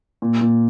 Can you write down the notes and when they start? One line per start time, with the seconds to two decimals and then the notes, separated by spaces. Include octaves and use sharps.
0.22 A#2
0.41 A#2